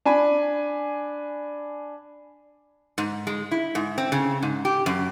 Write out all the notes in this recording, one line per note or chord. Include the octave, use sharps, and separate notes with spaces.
D4 G#5 B5
G#2
G#3
E4
G#2
C4
C#3
G#2
G4
F#2